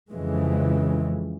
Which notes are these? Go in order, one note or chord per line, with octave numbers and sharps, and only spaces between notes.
F2 C#3 E3 G#3